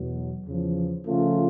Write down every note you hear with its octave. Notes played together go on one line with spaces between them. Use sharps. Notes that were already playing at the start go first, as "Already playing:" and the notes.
Already playing: E2 B2 F#3
E2 C#3 F3
C#3 F3 A3 C#4 F4